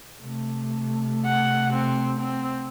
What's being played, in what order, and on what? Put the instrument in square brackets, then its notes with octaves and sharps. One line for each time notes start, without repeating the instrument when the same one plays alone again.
[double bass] C3 A3
[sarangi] F#5
C4
C4